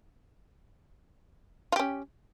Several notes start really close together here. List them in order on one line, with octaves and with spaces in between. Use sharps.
F4 G4 C#4